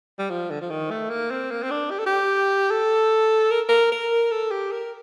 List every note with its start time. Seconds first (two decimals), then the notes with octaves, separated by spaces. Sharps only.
0.19 G3
0.30 F3
0.50 D3
0.61 F3
0.70 D#3
0.91 A3
1.10 A#3
1.31 C4
1.51 A#3
1.63 C4
1.71 D4
1.90 G4
1.99 A4
2.06 G4
2.70 A4
3.51 A#4
3.69 A#4
3.92 A#4
4.31 A4
4.51 G4
4.72 A#4